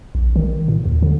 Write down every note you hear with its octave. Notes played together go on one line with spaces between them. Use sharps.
A#1
D#3
A2
D#2
D3